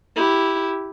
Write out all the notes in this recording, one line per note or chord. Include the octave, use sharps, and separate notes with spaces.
E4 G4